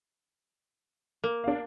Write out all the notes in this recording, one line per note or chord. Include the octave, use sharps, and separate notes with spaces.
A#3
D4 F5